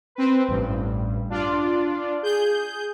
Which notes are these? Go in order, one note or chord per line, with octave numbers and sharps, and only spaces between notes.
C4 B4
A1 G2
D4 F4 D5
G#4 G6